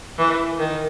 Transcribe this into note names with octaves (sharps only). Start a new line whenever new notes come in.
E3
D#3